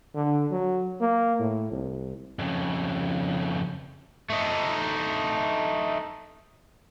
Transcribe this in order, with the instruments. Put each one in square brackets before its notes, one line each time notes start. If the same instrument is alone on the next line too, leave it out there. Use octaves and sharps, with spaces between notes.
[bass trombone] D3
F#3
A#3
A2
C2
[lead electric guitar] F2 C#3
[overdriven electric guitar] A3 D#4